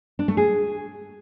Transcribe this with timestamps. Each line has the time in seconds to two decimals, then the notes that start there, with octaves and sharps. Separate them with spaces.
0.19 D4
0.28 A3
0.37 G#4